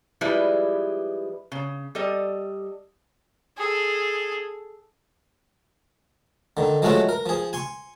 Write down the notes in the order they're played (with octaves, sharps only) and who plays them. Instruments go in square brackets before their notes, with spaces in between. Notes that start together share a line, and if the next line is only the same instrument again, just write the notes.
[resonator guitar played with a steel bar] F3 G3 G#3 E4 B4 D5
C#3
G3 A4 D#5
[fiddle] G#4 A4
[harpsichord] D3 D#3
F3 F#3 G#3 A3 F4 F#4
A#4
F3 G#4
G#5 C6 C#6